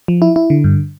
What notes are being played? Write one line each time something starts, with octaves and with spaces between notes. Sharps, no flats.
F3
E4
E4
D3
G2